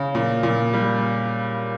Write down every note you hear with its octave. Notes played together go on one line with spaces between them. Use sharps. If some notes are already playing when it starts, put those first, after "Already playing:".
Already playing: C#3
A#2
A#2
G3